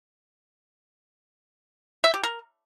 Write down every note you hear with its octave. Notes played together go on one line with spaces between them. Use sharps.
E5
G4
A#4